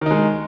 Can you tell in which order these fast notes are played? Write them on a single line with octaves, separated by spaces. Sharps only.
D#3 D#4 G#3